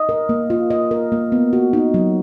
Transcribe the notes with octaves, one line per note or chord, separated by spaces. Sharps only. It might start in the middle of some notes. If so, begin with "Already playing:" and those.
Already playing: D#5
A#4
A#3
F4
D#5
A#4
A#3
B3
F#4
D#4
F#3